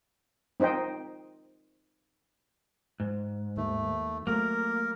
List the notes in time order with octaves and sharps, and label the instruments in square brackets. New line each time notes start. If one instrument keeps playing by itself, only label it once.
[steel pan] C4 D#4 C5 D#5 G5
[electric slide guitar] G#2
[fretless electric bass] D#2 D#3 [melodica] A3
[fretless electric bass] F#3 A3 C4 [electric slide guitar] A#3 [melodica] A#4